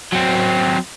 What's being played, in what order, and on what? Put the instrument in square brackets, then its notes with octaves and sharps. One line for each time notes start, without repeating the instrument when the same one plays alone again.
[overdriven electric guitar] F#3 C4